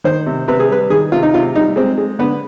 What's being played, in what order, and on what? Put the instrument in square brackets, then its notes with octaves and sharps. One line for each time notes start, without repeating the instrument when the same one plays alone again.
[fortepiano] D#3 C5
C3
C3 B4
G#4
G3 B4
D#3 G#4
C3 F4
D#4
C3 F4
G3 D#4
G#3 C4
G#3
D3 B3